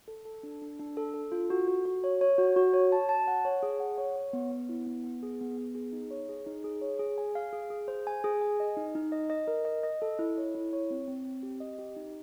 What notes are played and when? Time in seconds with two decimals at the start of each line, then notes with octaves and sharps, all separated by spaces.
0.08 A4
0.25 A4
0.43 D4
0.62 D4
0.80 D4
0.97 A4
1.14 A4
1.32 F4
1.50 F#4
1.68 F#4
1.85 F#4
2.04 C#5
2.21 C#5
2.38 F#4
2.56 F#4
2.74 C#5
2.92 A5
3.09 A5
3.27 F#5
3.45 C#5
3.63 G#4
3.80 F#5
3.98 C#5
4.16 C#5
4.33 B3
4.52 B3
4.69 E4
4.87 B3
5.04 B3
5.23 G#4
5.41 B3
5.58 B3
5.75 G#4
5.93 D#4
6.11 C#5
6.29 G#4
6.47 D#4
6.64 G#4
6.82 C#5
6.99 G#4
7.18 G#5
7.35 F5
7.53 G#4
7.70 G#4
7.88 C5
8.07 G#5
8.24 G#4
8.41 G#5
8.60 D#5
8.77 D#4
8.95 D#4
9.12 D#5
9.30 D#5
9.47 A#4
9.65 D#5
9.83 D#5
10.02 A4
10.19 E4
10.37 C#5
10.55 E4
10.73 C#5
10.91 C4
11.08 C4
11.25 C4
11.43 G4
11.60 D#5
11.79 G4
11.96 D#4